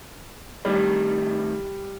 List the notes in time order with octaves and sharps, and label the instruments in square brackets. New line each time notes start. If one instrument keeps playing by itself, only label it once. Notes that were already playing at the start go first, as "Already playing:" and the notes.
[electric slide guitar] A2 D#3 [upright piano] G3